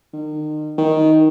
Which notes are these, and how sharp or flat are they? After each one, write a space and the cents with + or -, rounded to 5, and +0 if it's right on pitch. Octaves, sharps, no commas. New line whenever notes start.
D#3 -35
D#3 +10